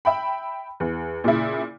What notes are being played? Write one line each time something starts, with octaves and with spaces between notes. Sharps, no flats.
E5 G5 B5
E2
A#2 C#3 E4